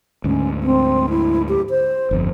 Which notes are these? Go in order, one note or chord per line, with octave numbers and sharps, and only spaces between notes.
D2 G#2 C#4
C4
E4
G4
C5
G1 F2